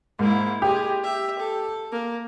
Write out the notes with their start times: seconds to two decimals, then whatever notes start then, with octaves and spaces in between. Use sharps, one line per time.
0.19 G#2 A#3 E4
0.62 G#3 G4 G#4
1.03 E5
1.39 A4
1.92 A#3